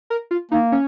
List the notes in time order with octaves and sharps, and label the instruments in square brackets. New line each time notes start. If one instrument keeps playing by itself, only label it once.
[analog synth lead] A#4
F4
[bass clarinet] A#3 [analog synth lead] D#4
[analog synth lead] C#4